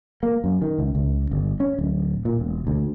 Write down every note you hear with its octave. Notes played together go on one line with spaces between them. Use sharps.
A#3
F#2
D#3
C#2
C#2
G1
C#4
D1
A#2
E1
D2